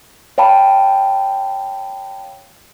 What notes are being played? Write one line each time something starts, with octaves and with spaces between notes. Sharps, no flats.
C#5 F5 G5 A5 B5